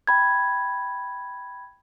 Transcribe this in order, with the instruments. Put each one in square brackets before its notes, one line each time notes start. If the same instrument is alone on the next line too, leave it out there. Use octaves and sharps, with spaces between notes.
[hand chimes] G5 B5 G#6